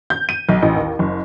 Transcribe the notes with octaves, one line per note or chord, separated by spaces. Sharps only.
G6
D#7
B1
A1
D#2
F#1